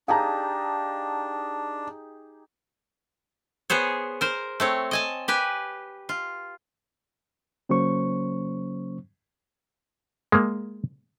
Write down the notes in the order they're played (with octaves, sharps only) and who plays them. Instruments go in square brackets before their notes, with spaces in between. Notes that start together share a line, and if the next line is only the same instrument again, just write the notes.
[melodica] D4 [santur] D#4 G4 G#4 [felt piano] F5 A5 A#5
[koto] B3 G#4 C5 C#5
A#4 C5
A3 C4 C#5
D#5 G#5 A5
G4 B4 G#5
F4
[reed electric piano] C#3 F#3 A#3 C#4 C5 C#6
[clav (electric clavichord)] G#3 A#3